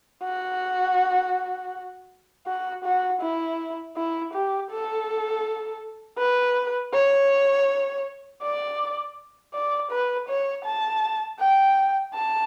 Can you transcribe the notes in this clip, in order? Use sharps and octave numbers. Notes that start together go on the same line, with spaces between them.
F#4
F#4
F#4
E4
E4
G4
A4
B4
C#5
D5
D5
B4
C#5
A5
G5
A5